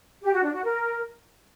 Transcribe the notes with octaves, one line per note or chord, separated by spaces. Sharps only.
G4
F#4
D4
F#4
A#4